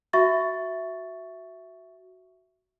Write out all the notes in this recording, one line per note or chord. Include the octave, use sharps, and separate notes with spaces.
F#4 E5 C#6 A6